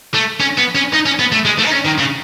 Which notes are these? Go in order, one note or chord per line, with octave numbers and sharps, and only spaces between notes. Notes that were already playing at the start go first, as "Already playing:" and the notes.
A3
C#4
B3
C#4
D#4
C#4
B3
A3
G#3
A3
D#4
C#4
D#3
C#3